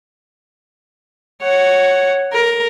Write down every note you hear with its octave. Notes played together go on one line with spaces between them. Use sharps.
C#5 F#5
A#4